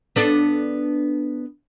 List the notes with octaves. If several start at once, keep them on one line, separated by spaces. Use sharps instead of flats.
B3 D4 A4